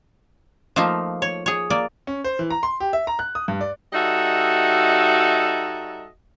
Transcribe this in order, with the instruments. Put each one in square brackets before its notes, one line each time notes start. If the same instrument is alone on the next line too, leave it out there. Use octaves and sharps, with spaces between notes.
[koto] F3 A3 A#3 D#4 F4
C#5
G#4 C#5
A#3 D5
[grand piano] C#4
C5
E3
A#5
C6
G4
E5
A#5
F#6
D#6
G2
D5
[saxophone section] G3 D#4 F#4 A4 D#5 E5